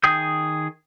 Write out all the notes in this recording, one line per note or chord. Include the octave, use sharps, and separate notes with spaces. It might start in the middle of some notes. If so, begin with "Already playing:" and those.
D#3 G#4 G5 D#6 G6